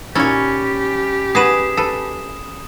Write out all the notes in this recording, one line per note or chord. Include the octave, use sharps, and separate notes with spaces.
A#2 C#4 D#4 E4 G4 C#5 B5 A6
B3 F#4 G#4 B4 D#6 E7
A4 B4